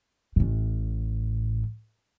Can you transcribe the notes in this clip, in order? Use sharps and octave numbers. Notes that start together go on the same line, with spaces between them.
A1 A2